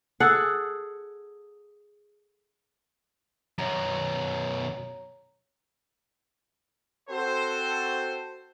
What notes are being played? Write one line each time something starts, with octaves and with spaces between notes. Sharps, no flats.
G#4 A4 F#5
F#2 B2 C#5 A#5
C4 F#4 A4 C5